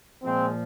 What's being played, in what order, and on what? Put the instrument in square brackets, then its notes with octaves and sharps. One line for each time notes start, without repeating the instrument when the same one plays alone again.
[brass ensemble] A#2 F3 G#3 C4